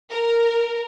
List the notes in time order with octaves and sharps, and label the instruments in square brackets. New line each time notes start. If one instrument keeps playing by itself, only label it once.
[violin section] A#4